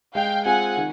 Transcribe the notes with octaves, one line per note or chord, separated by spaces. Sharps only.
G#3 F5 G5
C4 F4 G#4 F#5 G#5
D#3